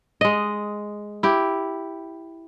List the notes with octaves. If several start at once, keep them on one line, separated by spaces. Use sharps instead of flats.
G#3 D#5
E4 G4